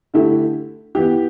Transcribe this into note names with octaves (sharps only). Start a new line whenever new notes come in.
D3 A3 E4 G4
E3 B3 G4